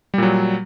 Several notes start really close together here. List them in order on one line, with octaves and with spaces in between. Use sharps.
G3 A#2 F#3